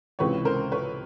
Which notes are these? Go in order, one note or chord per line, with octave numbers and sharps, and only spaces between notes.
C#2 C3 E3 G#3 B4 C#5
A#4 C5
B4 C#5